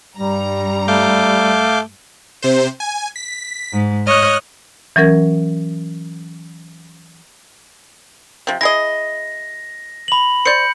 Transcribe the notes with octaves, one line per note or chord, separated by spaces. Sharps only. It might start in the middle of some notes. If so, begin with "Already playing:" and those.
G2 G3 A#5
A3 F5 D6 G6
C3 C5
G#5
B6
G#2
C#5 D#5 F6 F#6
E3 F#3 C#4 A#4 G#6
C3 F3
E4 G#4 D#5 A#6
B5 F#7
C5 D5 G6 C#7